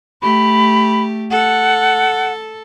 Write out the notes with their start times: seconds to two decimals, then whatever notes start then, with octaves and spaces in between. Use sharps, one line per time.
0.22 A3 G4 B5
1.31 A4 F#5